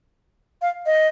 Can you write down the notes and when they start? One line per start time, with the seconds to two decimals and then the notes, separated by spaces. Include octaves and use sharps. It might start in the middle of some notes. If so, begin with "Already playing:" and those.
0.62 F5
0.86 D#5